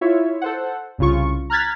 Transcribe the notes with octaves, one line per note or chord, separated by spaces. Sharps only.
E4 F4 C#5 E5
A4 C5 F#5
C2 C#3 F4 C#6
A#5 F6 F#6 G#6 A6 B6